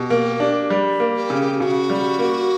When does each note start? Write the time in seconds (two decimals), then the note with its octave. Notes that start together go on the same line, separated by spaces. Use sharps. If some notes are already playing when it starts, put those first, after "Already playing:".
Already playing: B2 G4
0.10 A#3
0.40 D4
0.70 G3
1.00 A#3
1.15 G4
1.30 C#3
1.60 C#3 F#4
1.90 G3
2.19 A#3